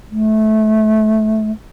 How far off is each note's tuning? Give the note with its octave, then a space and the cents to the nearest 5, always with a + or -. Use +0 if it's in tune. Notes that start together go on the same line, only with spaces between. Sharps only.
A3 -20